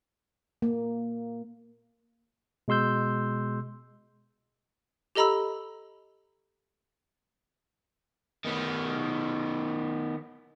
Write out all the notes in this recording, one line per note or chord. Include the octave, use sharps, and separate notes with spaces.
A#3
B2 G#3 C6 E6 G6
G4 A4 D#5 A#5 B5 E6
D#3 B3